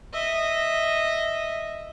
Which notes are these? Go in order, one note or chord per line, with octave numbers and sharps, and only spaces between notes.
D#5 E5